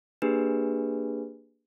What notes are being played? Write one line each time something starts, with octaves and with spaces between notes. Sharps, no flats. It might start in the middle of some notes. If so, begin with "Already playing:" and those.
A#3 D4 G4 G#4 B4